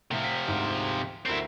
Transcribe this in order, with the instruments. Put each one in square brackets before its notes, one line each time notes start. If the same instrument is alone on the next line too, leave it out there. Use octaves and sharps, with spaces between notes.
[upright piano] A2 [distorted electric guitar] C3 F3
[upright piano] B6
D2 G#2
[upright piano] D2 A#4 C7 [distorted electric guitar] C4 E4